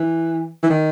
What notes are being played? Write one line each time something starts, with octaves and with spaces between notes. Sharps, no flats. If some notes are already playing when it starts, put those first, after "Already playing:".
Already playing: E3
E3
D#3